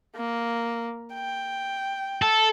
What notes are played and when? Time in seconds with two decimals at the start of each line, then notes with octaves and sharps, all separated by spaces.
0.16 A#3
1.14 G5
2.22 A4